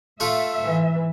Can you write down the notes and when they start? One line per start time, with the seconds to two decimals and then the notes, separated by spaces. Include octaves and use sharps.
0.20 A3 F4 A4 E5
0.60 G#2 E3